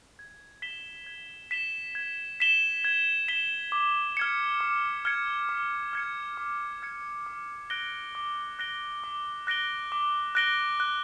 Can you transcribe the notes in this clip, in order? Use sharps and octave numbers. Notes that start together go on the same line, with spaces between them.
G#6
B6 E7 G7
G#6
B6 E7 G7
G#6
B6 E7 G7
G#6
B6 E7 G7
D6
F6 G#6 C#7
D6
F6 G#6 C#7
D6
F6 G#6 C#7
D6
F6 G#6 C#7
D6
F#6 A#6 D7 G7
D6
F#6 A#6 D7 G7
D6
F#6 A#6 D7 G7
D6
F#6 A#6 D7 G7
F#6